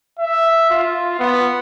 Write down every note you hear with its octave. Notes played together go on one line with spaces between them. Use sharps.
E5
F4
B3